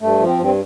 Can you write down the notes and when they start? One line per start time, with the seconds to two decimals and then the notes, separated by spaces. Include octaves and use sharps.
0.01 G2 A3
0.20 F3
0.26 C4
0.38 G2 C4